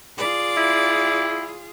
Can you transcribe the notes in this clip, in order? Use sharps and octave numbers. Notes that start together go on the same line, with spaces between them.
F4 G#4 D5
E4